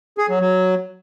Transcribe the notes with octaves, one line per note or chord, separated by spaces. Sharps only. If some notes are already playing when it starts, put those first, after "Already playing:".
G#4
F#3
F#3